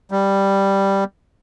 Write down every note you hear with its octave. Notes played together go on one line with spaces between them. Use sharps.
G3